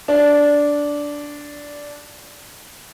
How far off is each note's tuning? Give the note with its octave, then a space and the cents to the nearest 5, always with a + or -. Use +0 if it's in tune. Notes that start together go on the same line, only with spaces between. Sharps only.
D4 -10